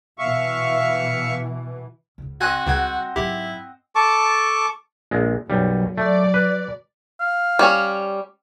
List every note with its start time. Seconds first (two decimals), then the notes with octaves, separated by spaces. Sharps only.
0.19 B2 E3 E5 F5 C#6
2.18 C#2 G#2
2.41 C4 F#4 D#5 G#5 F#6 G#6
2.66 C#2 C#3 G3 F#5 G#6
3.16 G#2 F#3 E4 G4
3.95 A4 A5 C#6 D6
5.11 A#1 G#3
5.50 B1 F#2 F#3 G3
5.98 F#3 A3 D5
6.34 B4
7.20 F5
7.59 G3 C#4